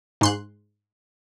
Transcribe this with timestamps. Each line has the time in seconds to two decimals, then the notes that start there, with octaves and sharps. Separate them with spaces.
0.21 G#2 C6 F#6